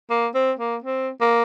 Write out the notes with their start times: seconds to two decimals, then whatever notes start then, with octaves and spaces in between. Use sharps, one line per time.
0.10 A#3
0.35 C4
0.59 A#3
0.84 C4
1.21 A#3